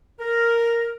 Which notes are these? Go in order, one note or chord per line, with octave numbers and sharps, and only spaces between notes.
A#4